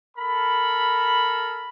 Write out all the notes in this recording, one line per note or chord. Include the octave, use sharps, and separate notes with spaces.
A4 A#4 B5